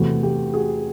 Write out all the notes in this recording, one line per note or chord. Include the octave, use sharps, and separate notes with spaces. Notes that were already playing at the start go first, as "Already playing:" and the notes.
Already playing: E2 C3 E3 A3 F#4
G4
F#4 G#4